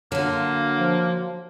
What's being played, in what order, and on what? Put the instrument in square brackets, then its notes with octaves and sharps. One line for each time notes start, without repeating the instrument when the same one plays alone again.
[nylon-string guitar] D3 [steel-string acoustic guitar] F#3 F4 [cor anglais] A#3
[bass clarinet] F3